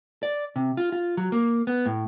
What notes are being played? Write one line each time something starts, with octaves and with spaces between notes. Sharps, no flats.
D5
C3
F4
F4
F#3
A#3
B3
A2